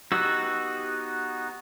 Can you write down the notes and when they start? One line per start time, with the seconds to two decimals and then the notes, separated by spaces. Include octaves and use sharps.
0.12 B3 D#4 F#4 G4 E6